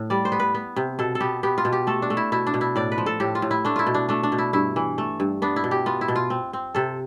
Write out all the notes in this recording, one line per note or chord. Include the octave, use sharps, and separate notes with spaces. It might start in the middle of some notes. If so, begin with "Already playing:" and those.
Already playing: A2
G3 D5
C5
B3
B4
B3
C3
B2 A4
A4
B3 G4
B3 G4
F4
B2
G4
A3 A4
D4
A3
E4
B2 E4
D4
B2
E4
A2 D5
B4
F3
A4
A2 G4
F4
A2
E4
A3 D4
E4 F4
B2
D4
A3 D4
D4
B2
E4
G2 E4
E3
A3
G2
B3 D4
E4
B2
G4
B3 F4
E4
B2
F4
C4
C4
C3 A4